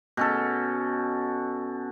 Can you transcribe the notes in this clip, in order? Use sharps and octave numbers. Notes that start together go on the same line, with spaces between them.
B2 C#4 A4